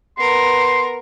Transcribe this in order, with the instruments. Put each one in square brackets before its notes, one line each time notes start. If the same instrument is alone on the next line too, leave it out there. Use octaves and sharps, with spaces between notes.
[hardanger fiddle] B3 A#4 [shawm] C6